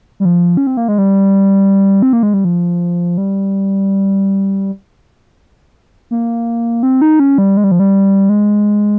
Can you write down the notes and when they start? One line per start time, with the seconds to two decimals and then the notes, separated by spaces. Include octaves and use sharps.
0.20 G3
0.25 F3
0.57 C#4
0.67 C4
0.77 A#3
0.88 G#3
0.98 G3
2.02 C4
2.13 A#3
2.23 G#3
2.34 G3
2.45 F3
3.18 G3
6.11 A#3
6.83 C4
7.02 D#4
7.20 C#4
7.38 G3
7.57 G#3
7.64 G3
7.72 F3
7.80 G3
8.29 G#3